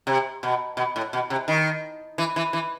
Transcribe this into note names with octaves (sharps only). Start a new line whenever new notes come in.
C3
B2
B2
A2
B2
C3
D#3
E3
E3
E3